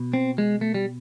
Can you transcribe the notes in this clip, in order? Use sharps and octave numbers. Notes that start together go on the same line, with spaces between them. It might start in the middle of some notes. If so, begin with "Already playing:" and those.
Already playing: B2
C4
G#3
A3
G3